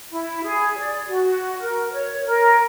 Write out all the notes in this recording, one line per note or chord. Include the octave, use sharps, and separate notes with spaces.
E4
G#4
D5
F#4
A#4
C#5
A#4